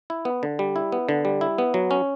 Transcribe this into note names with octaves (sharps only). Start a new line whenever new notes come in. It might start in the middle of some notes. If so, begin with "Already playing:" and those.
E4
B3
D3
G3
E4
B3
D3
G3
E4
B3
F#3
C#4